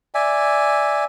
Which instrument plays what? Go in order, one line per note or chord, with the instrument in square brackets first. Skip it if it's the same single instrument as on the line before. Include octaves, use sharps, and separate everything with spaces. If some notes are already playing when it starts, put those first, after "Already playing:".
[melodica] D5 E5 G#5